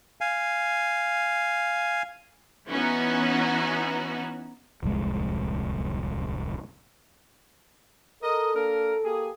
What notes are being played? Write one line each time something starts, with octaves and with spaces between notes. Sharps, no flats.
F5 G#5
E3 B3 C#4 D#4 F#4
D1 C2 F2 G#3
A4 A#4 D#5
A#3 D4 A#4
A#3 G4 G#4